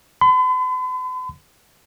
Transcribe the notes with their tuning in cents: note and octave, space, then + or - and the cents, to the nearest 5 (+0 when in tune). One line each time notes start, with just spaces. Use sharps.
B5 +45